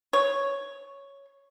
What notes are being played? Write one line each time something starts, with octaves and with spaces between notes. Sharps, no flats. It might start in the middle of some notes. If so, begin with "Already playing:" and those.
C#5